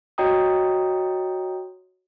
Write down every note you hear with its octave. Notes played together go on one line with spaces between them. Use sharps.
F#4 C#5 D#5 G5 A#5 D#6